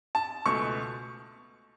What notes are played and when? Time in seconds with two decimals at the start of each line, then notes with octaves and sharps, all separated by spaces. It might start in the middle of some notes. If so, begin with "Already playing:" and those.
0.15 A5
0.46 C#2 B2 A3 C#6